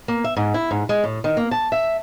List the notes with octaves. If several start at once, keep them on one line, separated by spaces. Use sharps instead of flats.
A#3
E5
G#2
E4
G#2
G#3
A2
D#3
A#3
A5
E5